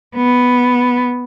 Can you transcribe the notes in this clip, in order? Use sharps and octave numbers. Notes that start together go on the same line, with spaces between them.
B3